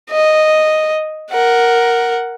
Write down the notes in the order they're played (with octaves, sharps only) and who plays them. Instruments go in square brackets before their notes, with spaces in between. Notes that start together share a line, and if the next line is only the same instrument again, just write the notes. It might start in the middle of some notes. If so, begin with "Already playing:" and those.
[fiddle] D#5
A#4 F#5